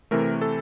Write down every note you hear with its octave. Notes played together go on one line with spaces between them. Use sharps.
C3 E3 A3 A#4
A4